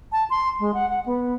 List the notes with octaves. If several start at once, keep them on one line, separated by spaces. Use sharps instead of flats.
A5
C6
G#3
F#5
F#5
B3